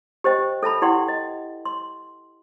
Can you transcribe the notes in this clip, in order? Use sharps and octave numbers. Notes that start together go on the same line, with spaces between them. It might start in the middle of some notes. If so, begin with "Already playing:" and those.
G4 C5 D#5 G5
A4 E5 A5 B5
E4 G4 D5 F#5 G5 C6
D#5
C6